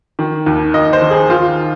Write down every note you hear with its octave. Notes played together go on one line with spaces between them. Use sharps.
D#3
D#2
D#2 D#5
C5
D#3
G#4
D#3 F4